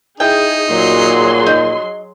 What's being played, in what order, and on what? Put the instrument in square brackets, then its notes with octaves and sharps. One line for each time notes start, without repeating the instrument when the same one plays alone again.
[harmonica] D#4 [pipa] E4 G5 [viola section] G#4
[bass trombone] A#2 [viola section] F#3 G#4 C6
[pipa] D#4